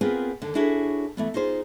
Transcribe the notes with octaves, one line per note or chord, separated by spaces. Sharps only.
B3 C4 F4 G#4 A#4 B4
D#2 D3
D4 E4 F#4 G#4 A4 C#5
E3 A3 B3
D#4 F4 G#4 C5